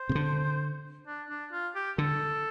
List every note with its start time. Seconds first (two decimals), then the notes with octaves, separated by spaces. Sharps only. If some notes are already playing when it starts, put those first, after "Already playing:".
Already playing: C5
0.09 C3
0.15 D3
1.07 D4
1.30 D4
1.52 F4
1.75 G4
1.98 D3 A4